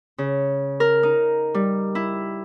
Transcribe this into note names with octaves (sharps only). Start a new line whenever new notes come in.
C#3
A#4
D#4
G3
E4